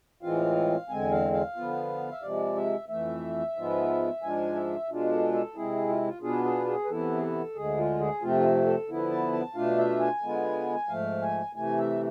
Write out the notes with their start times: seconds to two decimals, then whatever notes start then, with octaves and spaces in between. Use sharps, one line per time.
0.23 A2 E3 G#3 C4 F4 F5
0.89 E2 D3 G#3 C4 G#5
1.11 F5
1.33 F5
1.56 D3 F3 B3 F4
2.12 E5
2.22 C3 F3 G#3 D5
2.56 E5
2.89 F2 E3 A3 E5
3.56 G#2 F3 G#3 B3 F4
4.22 G#2 F3 G#3 D4 F4 G#5
4.55 E5
4.89 B2 G#3 D4 F4
5.12 A4
5.33 A4
5.55 C3 G#3 C4 E4 G#4
5.89 F4
6.07 F4
6.22 B2 B3 D4 F4 G#4
6.44 G#4
6.67 G#4
6.85 B4
6.88 C3 E3 B3 E4 A4
7.18 G#4
7.22 A4
7.56 D2 D3 G#3 G#4
7.77 F4
8.00 G#4
8.22 F2 C3 F3 A3 C4 F4
8.67 A4
8.88 D3 F3 B3 E4
9.11 A5
9.33 A5
9.55 B2 A3 D4 F4 F5
9.78 E5
9.99 G#5
10.22 D3 G#3 B3 F4
10.89 G#2 F3 A3 F5
11.22 G#5
11.55 C3 E3 A3 G#5
11.78 E5